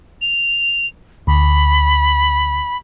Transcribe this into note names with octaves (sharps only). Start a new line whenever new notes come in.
F7
D2 B5